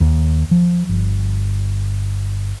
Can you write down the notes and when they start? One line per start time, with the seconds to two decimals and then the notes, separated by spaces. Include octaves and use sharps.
0.01 D#2
0.51 F3
0.89 G1